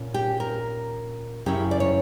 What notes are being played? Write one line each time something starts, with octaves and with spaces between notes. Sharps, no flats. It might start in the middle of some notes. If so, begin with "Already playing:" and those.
Already playing: A#2 C#4
G4
A#4
F#2 C#3 F#3 C#4 E4 G4
D5
C#5